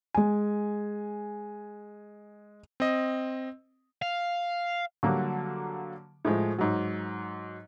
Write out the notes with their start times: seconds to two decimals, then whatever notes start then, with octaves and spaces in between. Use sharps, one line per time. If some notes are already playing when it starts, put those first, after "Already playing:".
0.14 G#3 G#5
2.80 C4 D#5
4.02 F5
5.03 D3 F#3 G3 A#3 F#4
6.25 A2 F3 G#3
6.58 G#2 F#3